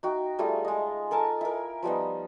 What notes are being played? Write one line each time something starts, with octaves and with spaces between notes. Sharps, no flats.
D#4 F#4 G5
G3 A3 F4 G#4
G#3 D#5
A4 A#4 G#5 A5
E4 A#4
F3 G3 B3 D#4